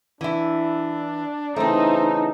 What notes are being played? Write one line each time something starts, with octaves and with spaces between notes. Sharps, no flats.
E3 D4 E4
C#3 E3 A3 C4 D4 D#4 C5